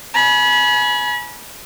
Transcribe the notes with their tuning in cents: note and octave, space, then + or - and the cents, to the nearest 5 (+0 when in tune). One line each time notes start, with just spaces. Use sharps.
G#5 +30 B5 -25